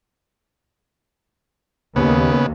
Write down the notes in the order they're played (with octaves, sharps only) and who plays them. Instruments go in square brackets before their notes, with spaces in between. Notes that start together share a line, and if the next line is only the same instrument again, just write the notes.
[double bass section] D#2 [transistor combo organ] C#3 B3